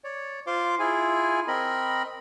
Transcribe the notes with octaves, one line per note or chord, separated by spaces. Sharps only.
C#5 D5
F4 C5 F5 C6 D6
E4 F4 G#4 G#5
C4 A#4 D#5 B5